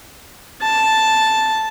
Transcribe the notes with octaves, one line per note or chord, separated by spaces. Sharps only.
A5